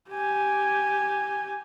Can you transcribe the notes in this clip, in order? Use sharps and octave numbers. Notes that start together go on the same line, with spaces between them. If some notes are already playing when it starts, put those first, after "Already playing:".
G4 G#5